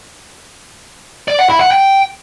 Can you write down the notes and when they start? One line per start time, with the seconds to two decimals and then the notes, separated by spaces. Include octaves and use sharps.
1.28 D5
1.39 F#5
1.50 E4
1.60 F#5
1.71 G5